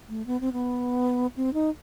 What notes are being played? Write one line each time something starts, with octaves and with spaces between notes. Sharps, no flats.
A3
B3
C4
B3
C4
D#4